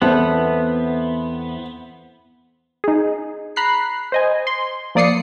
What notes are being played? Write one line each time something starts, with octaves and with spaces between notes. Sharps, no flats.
E2 B3 C4 E4 A4
D#4 G#4
A#5 B5 F#6 C7
C5 D#5 G#5
C6
F3 A#3 D5 D#6 C7 C#7